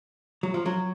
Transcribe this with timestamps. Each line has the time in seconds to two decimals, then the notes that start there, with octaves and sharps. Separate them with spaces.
0.43 F#3
0.54 F3
0.66 F#3